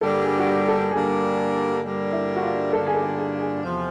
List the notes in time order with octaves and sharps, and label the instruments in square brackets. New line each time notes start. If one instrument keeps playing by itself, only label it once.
[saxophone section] G2 D3 G3 A#3 D4 [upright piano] A4
[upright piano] G#4
F#4
G4
A4
[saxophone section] G2 D3 G3 A#3 D4 [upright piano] G#4
[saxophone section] G2 D3 G3 A#3 D4
[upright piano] E4
F#4
F4
[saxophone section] G2 D3 G3 A#3 D4 [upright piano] A4
[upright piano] G#4
A4
G#4
G#4
[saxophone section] E2 C3 F3